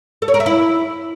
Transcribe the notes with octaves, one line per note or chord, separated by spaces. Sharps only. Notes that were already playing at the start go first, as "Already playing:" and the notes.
A4
C#5
A#4
E5
E4